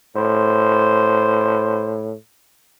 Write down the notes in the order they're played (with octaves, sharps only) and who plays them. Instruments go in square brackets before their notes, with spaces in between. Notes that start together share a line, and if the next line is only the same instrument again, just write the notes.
[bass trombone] A2 [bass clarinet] C5